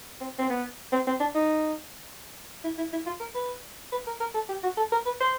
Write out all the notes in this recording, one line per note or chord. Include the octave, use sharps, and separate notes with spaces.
C4
C4
B3
C4
C4
D4
D#4
E4
E4
E4
F4
A#4
B4
B4
A#4
A#4
A4
G4
F#4
A4
A#4
B4
C5